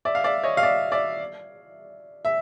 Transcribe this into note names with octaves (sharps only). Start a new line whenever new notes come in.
D5 E5
F5
D5 E5
C#5 D#5
F5
D5 E5
D5 E5
E5